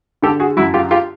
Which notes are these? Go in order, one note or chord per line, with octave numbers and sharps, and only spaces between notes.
D3 G4 A4
F#4 G#4
F#2 E4 F#4
F4 G4
F4 G4